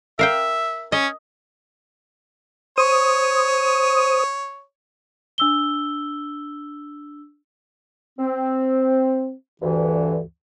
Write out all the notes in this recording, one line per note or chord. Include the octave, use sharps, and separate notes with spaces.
A#4 E5 F5 G5
C#4 D#5
C5 C#5 D#6
D4 E6 G7
C4
D2 G2 E3